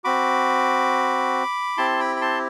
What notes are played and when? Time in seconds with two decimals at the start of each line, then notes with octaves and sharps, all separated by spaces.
0.04 C4 F#4 B5 D6
1.77 C4 E4 G4 A5 C6
2.00 G5 B5
2.16 B5
2.21 A5 C6